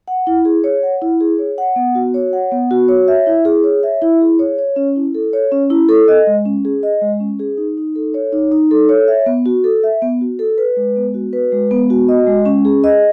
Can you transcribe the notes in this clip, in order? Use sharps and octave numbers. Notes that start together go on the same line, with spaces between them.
F#5
E4
G#4
C#5
F#5
E4
G#4
C#5
F#5
B3
F#4
C#5
F#5
B3
F#4
C#5
E5
E4
G#4
C#5
E5
E4
G#4
C#5
C#5
C#4
E4
A4
C#5
C#4
E4
A4
D#5
G#3
C#4
G#4
D#5
G#3
C#4
G#4
D#4
D#4
A4
C#5
D#4
D#4
A4
C#5
E5
B3
F#4
A4
E5
B3
F#4
A4
B4
G#3
B3
F#4
B4
G#3
B3
F#4
D#5
G#3
C#4
G#4
D#5